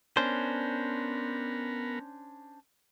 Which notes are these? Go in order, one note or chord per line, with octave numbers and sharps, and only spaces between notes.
B3 C#4 D4 A#4 C5